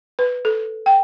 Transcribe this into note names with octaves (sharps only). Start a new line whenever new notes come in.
B4
A4
G5